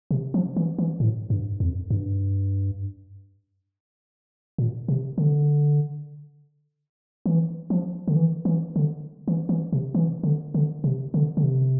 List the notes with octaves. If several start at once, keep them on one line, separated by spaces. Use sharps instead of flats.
C3
F3
E3
E3
A2
G2
F2
G2
A#2
C3
D3
E3
F3
D3
E3
E3
D3
E3
E3
C3
E3
D3
D3
C3
D3
D3
C3